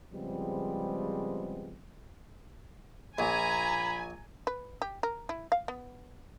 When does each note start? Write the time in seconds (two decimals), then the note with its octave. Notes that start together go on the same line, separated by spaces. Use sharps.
0.14 C#3 F3 G3 G#3 B3 C4
3.19 A#1 G#5 A#5 B5
4.47 B4
4.82 G4
5.03 A#4
5.29 E4
5.52 F5
5.68 B3